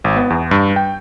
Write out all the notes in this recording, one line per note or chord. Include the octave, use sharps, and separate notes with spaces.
G#1
B3
E2
G2
G5